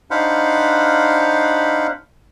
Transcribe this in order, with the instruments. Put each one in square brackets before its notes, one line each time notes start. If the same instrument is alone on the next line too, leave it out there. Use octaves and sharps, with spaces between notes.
[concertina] D4 D#4 C5 F5 F#5 B5